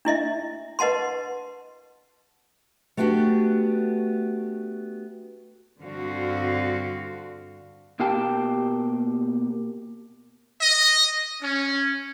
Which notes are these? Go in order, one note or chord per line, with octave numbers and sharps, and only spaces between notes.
D4 E4 D#5 E5
B4 D#5 F#5 A5 C6
A3 B3 D4 F#4 G4
G2 D3 C4 F#4 F5
B2 A#3 G4 F5 G5 A5
D#5
C#4